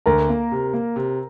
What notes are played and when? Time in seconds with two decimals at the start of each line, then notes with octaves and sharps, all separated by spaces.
0.06 D2 A#4 A#5
0.29 A#3
0.52 C3
0.73 A#3
0.96 C3